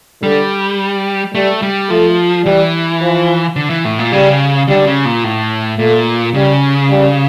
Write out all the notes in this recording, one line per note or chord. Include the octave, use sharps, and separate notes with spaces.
D3 G3
G3 A3
G3
F3 A3
E3 G3
F3
D3
E3
A2
A#2
C#3 G3
D3 G3
C#3
A#2
A2
A#2 A3
C#3 G3
G3